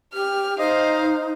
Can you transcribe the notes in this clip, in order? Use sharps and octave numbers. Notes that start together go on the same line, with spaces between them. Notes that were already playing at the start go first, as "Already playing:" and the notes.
G4 F6
D#4 C5 D#5 F5